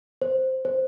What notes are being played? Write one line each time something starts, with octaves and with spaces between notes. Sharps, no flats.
C5
C5